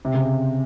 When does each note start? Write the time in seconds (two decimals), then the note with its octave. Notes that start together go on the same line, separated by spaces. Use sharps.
0.05 C3
0.14 C#3